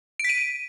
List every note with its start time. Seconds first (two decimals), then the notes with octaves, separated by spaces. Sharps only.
0.19 D7
0.24 B6
0.29 D#7